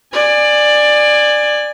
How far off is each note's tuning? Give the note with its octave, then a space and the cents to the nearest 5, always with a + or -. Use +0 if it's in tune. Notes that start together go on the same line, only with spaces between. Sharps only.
D5 +15 G#5 -10